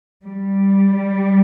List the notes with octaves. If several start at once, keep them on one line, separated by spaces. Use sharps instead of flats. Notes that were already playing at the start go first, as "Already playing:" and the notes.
G3